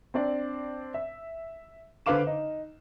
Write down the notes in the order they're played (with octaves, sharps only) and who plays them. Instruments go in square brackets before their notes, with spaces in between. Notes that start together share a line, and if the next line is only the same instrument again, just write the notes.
[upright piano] C4 D4 D5
E5
D3 B4 C5 F5 D6 E7
D#4